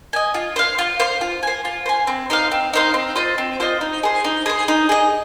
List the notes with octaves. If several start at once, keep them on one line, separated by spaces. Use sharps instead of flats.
D#5 G#5
F4
C5 F5
F4
C5 F5
F4
C5 G#5
F4
C5 G#5
C4
D#4 C5 F5
C4
D#4 C5 F5
C4
F4 C5 D#5
C4
F4 C5 D#5
D#4
G#4 C5
D#4
G#4 C5
D#4
G#4 D#5